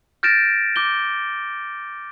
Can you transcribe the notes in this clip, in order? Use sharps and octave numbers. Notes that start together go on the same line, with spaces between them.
F6 G6 A6 A#6 D7 E7
D6 G6 G7